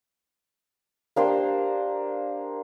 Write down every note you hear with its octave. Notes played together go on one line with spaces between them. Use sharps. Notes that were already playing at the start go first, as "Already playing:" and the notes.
A#3 D4 G4 C5